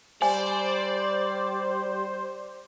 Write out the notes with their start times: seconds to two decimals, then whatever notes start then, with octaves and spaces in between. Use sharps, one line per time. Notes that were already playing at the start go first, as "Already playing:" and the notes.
0.22 G3 C5 D5 G#5